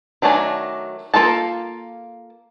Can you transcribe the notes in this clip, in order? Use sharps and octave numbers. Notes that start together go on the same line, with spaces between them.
D#3 F#3 A3 D4 G#5
A#3 F4 A4 A5